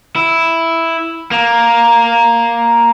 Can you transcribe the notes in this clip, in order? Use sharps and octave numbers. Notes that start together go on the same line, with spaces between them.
E4
A#3